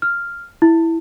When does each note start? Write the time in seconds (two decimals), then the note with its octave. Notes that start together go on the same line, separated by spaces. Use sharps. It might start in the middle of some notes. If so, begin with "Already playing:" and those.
0.02 F6
0.62 E4